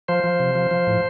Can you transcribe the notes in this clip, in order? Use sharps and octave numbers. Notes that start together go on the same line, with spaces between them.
F3 C5
F3
C3
F3
F3
A2